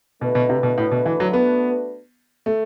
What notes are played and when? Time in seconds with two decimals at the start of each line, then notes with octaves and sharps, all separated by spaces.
0.21 B2 A3 D4 F#4 B4
0.35 B2
0.49 C3
0.63 B2
0.78 A2
0.91 B2
1.06 E3
1.20 F#3
1.33 B3
2.46 A3